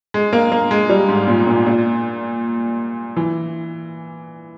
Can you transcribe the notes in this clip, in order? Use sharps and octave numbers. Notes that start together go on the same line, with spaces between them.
G#3
A#3
A#3
G#3
G3
G#2
A#2
A#2
A#2
E3